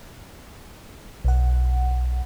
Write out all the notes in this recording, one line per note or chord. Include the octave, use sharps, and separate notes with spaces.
B1 F#5